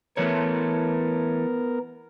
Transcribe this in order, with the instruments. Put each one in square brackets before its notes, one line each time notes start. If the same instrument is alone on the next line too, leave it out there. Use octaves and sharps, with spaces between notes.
[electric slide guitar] E3 A3 C#5 [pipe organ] B3 A#4